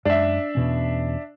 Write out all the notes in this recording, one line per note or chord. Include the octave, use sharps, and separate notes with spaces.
F#2 G#3 D4 E5
E2 B2 C#4